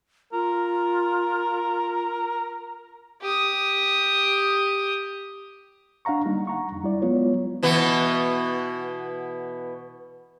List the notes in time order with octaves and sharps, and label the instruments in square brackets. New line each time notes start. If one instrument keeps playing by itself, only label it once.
[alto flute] F4 [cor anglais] A#4
[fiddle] G4 D#6
[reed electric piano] D4 F5 F#5 A#5 C#6
G3 A#3 D#4
F#5 A#5 C#6
F2
G3 E4 D5
F#3 G#3 B3 F4 C#5
[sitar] B2 E3 B3